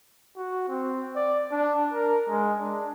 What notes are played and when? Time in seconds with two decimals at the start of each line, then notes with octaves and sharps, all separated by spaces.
0.37 F#4
0.68 C4
1.16 D5
1.52 D4
1.93 A#4
2.28 G#3
2.60 D4